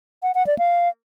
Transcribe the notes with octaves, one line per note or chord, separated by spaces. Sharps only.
F#5
F#5
D5
F5